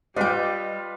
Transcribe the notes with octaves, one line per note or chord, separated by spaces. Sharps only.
G3 F4 B4 D5 D#5 G5